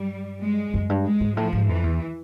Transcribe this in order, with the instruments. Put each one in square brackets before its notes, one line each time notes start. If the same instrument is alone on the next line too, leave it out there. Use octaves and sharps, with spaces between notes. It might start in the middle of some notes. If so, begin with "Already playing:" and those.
Already playing: [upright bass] G2 [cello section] G3
[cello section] G#3
[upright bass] F#2
G2
[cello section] G#3
[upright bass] G#2
[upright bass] A2 [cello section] F3
[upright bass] G#2
[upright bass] F2 [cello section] E3
[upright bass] E2